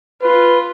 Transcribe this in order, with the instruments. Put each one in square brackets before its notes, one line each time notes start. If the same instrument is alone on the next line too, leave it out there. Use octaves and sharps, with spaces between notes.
[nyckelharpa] F4 [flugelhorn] B4